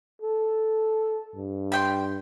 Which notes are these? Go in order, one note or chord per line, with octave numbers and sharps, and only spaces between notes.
A4
G2
G3 G5 C6